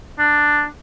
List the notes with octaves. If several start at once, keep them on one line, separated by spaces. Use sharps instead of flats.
D4